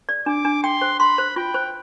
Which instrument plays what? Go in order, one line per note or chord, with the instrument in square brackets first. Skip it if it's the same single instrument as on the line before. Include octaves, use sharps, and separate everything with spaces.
[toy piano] D5
[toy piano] D4 [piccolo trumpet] D6
[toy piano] D4
[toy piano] G5 [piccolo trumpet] C6
[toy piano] C5
[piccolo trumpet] B5 [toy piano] C6
[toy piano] C5
[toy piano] F4 [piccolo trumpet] G5
[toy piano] C5